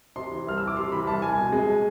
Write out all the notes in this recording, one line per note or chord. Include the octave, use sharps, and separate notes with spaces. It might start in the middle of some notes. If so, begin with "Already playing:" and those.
C3 C6
E3
C2 F6
C2 E6
D6
C3 C6
E3 B5
C2 A5
C2 G#5
B2
G#3